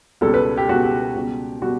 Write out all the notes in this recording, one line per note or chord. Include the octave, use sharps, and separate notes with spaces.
C#2 B2 G3 A4
B4
G4
C#2 B2 G3 F#4
G4
C#2 B2 G3
B2 G3 F#4